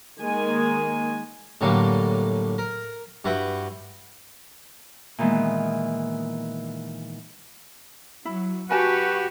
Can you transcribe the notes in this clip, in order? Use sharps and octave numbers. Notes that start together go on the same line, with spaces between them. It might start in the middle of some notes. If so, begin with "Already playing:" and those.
D#3 G#3 A#3 G#5
A2 D3 F#3 G3 A#3
A#4
G2 E4 F#4 B4 F#5 G5
A#2 D#3 E3 G#3 B3
F#3 E4
F#4 G4 B4 G#5 A5